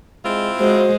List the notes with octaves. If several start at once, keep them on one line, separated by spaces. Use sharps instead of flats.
G#3 C4 E4 F4
G#3 F#4 C5